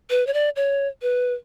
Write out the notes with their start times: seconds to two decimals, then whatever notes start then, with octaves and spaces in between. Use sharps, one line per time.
0.10 B4
0.27 C#5
0.34 D5
0.56 C#5
1.02 B4